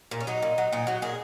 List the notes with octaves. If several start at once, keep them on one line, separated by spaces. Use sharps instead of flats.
A#2
C#4
F#3 D#4
A#2
F#3
A#2 D#4
F#3 F#4
A#2 G#4